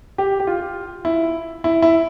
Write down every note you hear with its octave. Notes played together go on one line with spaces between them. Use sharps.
G4
G4
F4
E4
E4
E4